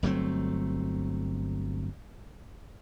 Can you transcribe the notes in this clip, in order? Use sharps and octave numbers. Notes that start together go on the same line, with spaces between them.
G1 F#3 A3 C4